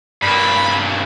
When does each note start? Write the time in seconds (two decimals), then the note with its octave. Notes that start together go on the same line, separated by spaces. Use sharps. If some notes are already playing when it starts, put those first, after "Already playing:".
0.22 G2 A#3 B5